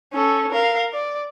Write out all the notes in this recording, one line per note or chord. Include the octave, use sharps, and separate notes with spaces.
C#4 A4
A#4 F5
D5